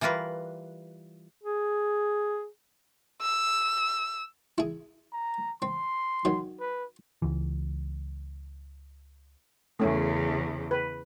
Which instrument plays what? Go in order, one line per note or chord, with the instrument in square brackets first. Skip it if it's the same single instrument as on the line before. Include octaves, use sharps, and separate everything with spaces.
[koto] E3 G3 F4 A#4 B4
[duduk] G#4
[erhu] E6
[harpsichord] E4 G#4
[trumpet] A#5
[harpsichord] C4 [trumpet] C6
[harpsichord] D#3 F#3
[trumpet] B4
[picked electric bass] C#2 E3
[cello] E2 C#3 [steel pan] A3 C#4
[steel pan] B4